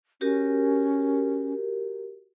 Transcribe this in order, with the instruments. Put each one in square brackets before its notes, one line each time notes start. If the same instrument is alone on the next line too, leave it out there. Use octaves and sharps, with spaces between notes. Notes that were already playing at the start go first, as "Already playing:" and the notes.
[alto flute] C#4 [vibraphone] F#4 G4 A#4